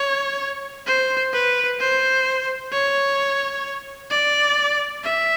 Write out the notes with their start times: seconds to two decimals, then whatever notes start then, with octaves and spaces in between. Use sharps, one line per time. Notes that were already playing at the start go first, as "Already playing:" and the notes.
Already playing: C#5
0.87 C5
1.33 B4
1.80 C5
2.72 C#5
4.11 D5
5.04 E5